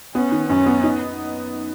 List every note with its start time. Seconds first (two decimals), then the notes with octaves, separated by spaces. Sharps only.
0.14 B3 C#4
0.32 D#3
0.49 F#2 C#4
0.66 B3
0.83 D#4